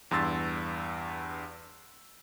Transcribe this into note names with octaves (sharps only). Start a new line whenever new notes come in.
E2 G2 C6 E6 A6